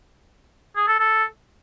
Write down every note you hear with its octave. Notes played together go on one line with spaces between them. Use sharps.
G#4
A4
A4